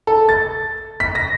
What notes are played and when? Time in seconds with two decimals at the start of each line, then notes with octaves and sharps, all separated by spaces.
0.07 A4
0.29 A6
1.00 B6
1.15 A#6